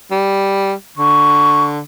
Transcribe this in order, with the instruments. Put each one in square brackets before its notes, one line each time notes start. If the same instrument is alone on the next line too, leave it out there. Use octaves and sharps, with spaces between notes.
[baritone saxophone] G3
[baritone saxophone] D3 [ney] C#6